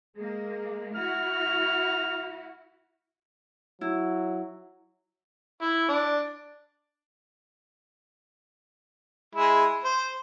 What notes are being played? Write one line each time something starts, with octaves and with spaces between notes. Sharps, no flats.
G#3 A#3 G#4
E4 F#4 F6
F#3 E4
E4
D4
G#3 E4
C5